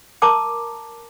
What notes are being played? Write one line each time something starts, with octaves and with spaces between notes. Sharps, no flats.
A#4 A5 A#5 D6 D#6